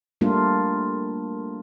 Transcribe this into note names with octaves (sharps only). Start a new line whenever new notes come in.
G3 A3 A#3 D4 F4